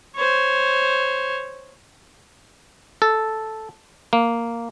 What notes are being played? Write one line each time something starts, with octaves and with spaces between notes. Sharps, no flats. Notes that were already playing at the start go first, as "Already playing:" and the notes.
C5 C#5
A4
A#3